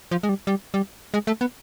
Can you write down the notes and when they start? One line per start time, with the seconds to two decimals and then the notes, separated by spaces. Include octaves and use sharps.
0.11 F3
0.23 G#3
0.29 G3
0.47 G3
0.74 G3
1.14 G#3
1.27 A3
1.41 B3